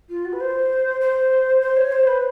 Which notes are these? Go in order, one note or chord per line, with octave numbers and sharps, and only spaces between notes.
F4
F#4
B4
C5
C5
C5
C#5
C5
B4